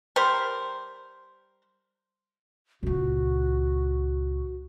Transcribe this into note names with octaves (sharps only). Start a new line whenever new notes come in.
G3 A#4 C5
C#2 A#2 F#4